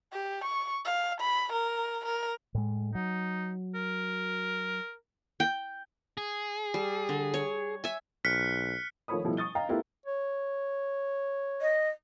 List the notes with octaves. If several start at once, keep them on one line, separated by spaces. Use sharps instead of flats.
G4
C#6
F5
B5
A#4
A#4
A2 G#3
F#3 D#4
A#4
G5
G#4
G3
D3
C#5
E5 G#5
B1 F6 F#6 B6 C#7
D#3 F3 A3 C#5 B5 D#6
B2 F3 G3 A3 E4
C#6 D#6 A6 G7
D#5 F5 G5 A#5
A3 B3 E4 F4 G4 A#4
C#5
D#5